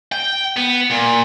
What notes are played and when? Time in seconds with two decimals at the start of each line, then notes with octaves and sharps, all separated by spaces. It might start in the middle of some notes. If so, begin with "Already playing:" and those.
0.12 G5
0.56 B3
0.90 A#2